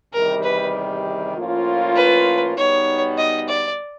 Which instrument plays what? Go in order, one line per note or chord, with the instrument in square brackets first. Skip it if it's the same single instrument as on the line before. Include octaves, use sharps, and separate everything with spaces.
[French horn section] E2 C3 D#3 G3 [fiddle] A#4
[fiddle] B4
[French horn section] A2 F3 A#3 C#4 F4
[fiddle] B4
[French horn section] B2 G3 B3 D#4 [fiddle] C#5
[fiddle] D#5
D5